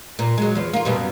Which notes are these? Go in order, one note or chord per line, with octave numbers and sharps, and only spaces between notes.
A#2
F#3 G#3
E2 F3
A#3 F4
F#2 B2 G3